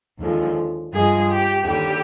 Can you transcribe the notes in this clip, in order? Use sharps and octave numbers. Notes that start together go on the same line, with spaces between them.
D#2 D3 F3 G#3
G2 F3 G#3 G#4
G4
D#2 D3 G3 G4